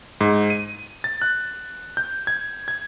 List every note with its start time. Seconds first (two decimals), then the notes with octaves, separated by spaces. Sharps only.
0.21 G#2
0.50 D#7
1.04 A6
1.22 F#6
1.97 G6
2.27 G#6
2.68 G#6